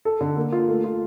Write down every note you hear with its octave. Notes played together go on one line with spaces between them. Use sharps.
A4
D3
A#3
F4
A3
F4